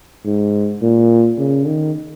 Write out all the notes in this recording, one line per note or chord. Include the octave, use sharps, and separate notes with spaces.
G#2
A#2
C#3
D#3